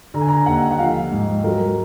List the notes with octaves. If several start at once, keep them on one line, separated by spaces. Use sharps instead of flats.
D3 A#5
G#5
A#5
D#2 F#5
F#5
F3 F5
G#2
F#3 A#4